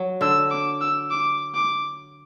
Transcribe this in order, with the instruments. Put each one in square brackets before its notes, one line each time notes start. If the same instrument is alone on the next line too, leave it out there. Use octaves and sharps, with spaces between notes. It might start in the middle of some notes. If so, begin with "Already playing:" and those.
Already playing: [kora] F#3
[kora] D3 [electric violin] E6
[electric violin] D6
E6
D6
D6